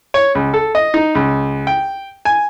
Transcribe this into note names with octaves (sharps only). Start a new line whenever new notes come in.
C#5
C#2
A4
D#5
D#4
C#2
G5
G#5